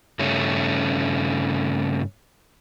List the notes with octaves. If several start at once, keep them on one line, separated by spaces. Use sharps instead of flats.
G2 C#3 A3 C#4